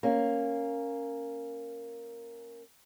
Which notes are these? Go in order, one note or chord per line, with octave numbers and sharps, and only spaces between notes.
A#3 C#4